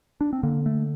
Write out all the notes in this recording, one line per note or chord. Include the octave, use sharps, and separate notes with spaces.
D4
C4
D3 A#3
A3